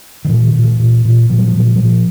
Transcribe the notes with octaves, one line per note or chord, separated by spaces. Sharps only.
D#3
A#2 E3
D#3
A#2
E3
A#2
A#2
A#2 F3
F#3
F3
A#2 F#3
F3
F#3
A#2 F3